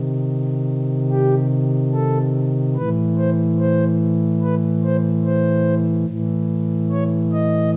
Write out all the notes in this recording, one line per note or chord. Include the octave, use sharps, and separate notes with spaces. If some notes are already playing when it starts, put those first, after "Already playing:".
Already playing: C3 D#3
G4
A4
A2 E3 B4
C5
C5
B4
C5
C5
A2 E3
C#5
D#5